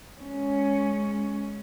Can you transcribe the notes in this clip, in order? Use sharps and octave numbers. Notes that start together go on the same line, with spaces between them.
G#3 C#4